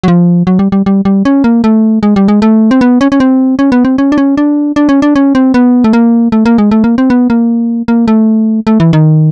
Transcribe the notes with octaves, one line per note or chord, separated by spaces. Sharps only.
F#3
F3
F#3
G3
G3
G3
G3
C#4
A#3
A3
G#3
G3
G#3
A3
C4
B3
C#4
C#4
C4
C#4
B3
C4
C#4
D4
C#4
D4
D4
C#4
D4
C#4
C4
B3
A3
A#3
A3
A#3
G#3
A3
A#3
C4
B3
A#3
A#3
A3
A3
E3
D#3